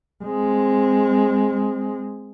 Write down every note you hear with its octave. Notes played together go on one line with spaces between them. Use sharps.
G#3 C4